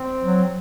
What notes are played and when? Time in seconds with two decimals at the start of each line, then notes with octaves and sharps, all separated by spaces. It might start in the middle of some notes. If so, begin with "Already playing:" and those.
Already playing: C4
0.22 F#3